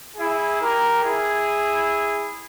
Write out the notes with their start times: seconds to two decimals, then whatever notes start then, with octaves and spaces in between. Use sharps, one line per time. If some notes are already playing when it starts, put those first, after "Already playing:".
0.16 E4 G#4
0.60 G4 A#4
1.03 E4 G#4